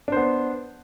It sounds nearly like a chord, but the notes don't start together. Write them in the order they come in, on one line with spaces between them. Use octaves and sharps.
D4 C5 B3